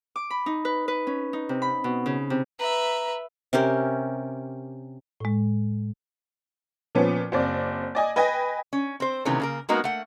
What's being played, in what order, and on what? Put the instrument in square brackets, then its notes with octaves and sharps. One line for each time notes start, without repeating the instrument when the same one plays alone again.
[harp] D6
B5
D#4
B4
B4
C#4
D#4
C3
B5
B2
C#3
C3
[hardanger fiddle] B4 E5 [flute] A#5
[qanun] C3 C#4 G4 A#4
[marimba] A2 G#3
[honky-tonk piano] A#2 F3 B3 C#4
F#1 C4 D5
D5 D#5 G#5
B4 D#5 G5 G#5 A#6
[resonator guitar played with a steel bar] C#4
C4 C5
C3 D#3 E3 A3 B3 C#4
C#3 A#3 A#4
G#3 A#3 B3 D#4 F#4 A#4
A3 A#3 F#5